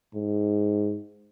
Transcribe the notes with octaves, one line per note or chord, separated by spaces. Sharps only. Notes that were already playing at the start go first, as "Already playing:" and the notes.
G#2